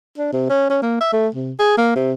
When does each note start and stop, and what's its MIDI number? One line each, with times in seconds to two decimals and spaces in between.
0.18 0.31 62
0.33 0.49 48
0.49 0.68 61
0.70 0.81 61
0.82 1.00 58
1.01 1.12 76
1.13 1.28 57
1.35 1.52 48
1.59 1.75 68
1.77 1.92 58
1.95 2.12 48